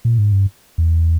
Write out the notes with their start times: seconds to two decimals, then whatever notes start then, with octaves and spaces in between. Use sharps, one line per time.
0.05 A#2
0.18 G#2
0.32 G2
0.78 E2